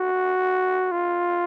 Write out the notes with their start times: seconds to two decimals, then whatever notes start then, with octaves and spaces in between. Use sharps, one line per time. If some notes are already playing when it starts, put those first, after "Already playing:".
Already playing: F#4
0.91 F4